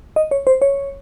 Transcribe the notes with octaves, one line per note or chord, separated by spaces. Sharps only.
D#5
C#5
C5
C#5